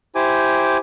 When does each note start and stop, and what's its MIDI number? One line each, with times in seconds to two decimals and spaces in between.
0.15 0.77 64
0.15 0.77 67
0.15 0.77 72
0.15 0.77 80
0.15 0.77 86